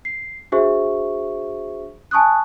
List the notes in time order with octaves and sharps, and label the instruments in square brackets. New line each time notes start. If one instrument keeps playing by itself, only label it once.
[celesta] C7
D4 F#4 G#4 C5 E5 C#6
G#5 A5 C#6 D#6 F#6